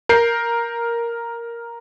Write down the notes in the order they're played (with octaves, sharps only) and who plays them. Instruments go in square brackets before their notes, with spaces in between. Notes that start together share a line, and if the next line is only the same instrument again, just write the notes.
[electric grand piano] A#4 G6 C7